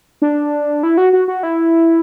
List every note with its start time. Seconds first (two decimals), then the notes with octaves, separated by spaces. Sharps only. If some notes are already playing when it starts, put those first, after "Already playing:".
0.22 D4
0.83 E4
0.97 F#4
1.13 F#4
1.28 F#4
1.43 E4